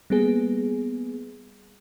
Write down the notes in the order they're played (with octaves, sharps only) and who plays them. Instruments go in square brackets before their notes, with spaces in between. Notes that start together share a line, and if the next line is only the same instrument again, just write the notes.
[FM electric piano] G3 A#3 B3 G#4